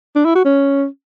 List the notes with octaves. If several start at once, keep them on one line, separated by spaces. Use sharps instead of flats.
D4
E4
F#4
C#4